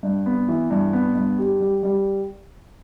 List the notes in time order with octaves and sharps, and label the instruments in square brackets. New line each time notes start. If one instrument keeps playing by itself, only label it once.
[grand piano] G2
B3
E3
G2
B3
G2
G4
G3
G3